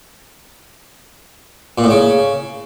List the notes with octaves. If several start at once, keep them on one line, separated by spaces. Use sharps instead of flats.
A#2
A2
C#3